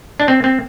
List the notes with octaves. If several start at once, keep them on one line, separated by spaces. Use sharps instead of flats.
D4
C4
C4